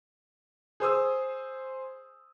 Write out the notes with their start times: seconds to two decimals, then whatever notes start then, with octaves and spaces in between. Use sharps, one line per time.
0.80 G#4 C5 D#6 E6